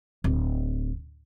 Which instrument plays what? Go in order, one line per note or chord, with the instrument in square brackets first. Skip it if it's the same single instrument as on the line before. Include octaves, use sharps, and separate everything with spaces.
[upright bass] D1